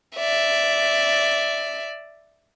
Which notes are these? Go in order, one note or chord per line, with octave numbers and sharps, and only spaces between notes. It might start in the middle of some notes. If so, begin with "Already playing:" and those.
D5 E5